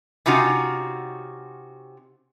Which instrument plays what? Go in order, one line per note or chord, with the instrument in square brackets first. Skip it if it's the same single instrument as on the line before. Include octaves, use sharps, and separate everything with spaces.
[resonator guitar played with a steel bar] C3 C#4 D#4 F4 F#4